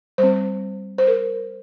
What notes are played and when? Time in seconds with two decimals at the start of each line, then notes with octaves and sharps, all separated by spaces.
0.18 G3 C4 C5
0.98 C5
1.07 A#4